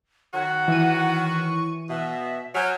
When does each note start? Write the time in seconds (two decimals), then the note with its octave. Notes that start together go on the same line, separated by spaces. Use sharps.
0.34 D#3 F#3 F#4 F#5
0.68 E3 D#7
1.27 C#6
1.89 B2 E5
2.55 F#3 G#5 F6 G6